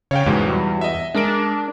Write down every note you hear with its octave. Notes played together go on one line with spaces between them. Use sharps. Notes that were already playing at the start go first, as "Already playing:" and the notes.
C#3 C#5 F5 G5
E2 G#2 B2 G#3
F#3 G3
D#5 E5
G#3 D4 A#4 D7